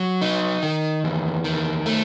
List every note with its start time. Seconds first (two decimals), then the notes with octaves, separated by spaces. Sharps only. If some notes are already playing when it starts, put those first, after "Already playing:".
Already playing: F#3
0.22 D#4
0.63 D#3
1.04 E2
1.44 D#3
1.86 A3